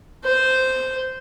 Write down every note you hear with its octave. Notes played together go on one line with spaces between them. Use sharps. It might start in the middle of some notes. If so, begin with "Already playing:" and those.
C5